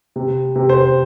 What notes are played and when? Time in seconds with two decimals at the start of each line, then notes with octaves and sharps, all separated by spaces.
0.16 C3
0.56 C3
0.69 C5